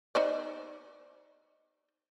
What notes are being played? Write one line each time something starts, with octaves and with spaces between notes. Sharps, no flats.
D#4 C5 D5